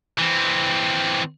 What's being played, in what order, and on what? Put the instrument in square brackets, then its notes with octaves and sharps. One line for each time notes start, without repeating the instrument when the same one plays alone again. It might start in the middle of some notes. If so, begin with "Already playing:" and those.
[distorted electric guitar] E3 C4